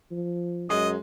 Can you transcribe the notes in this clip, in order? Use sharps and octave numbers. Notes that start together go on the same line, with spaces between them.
F3
F#2 G#3 D#5